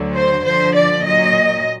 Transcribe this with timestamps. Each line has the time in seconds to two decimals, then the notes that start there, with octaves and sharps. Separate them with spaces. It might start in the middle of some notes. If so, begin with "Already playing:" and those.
Already playing: D2 D3 F#3
0.15 C5
0.44 G2 D3 F3 C5
0.74 D5
1.03 A#2 F#3 D#5